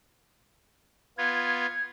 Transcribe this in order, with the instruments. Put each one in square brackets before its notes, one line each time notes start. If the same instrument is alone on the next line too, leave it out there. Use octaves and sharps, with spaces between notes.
[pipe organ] B3 F4 [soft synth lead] G#6